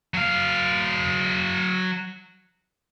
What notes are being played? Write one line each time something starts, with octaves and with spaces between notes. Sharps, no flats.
F#3 F5